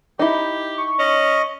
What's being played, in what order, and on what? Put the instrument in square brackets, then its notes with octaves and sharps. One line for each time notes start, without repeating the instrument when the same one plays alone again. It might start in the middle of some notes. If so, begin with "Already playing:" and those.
[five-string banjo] D#4 E4 [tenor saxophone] G4
[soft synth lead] C#6
[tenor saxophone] C#4 [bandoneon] D#5